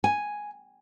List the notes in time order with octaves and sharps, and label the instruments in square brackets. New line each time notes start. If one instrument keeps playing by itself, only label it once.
[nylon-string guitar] G#5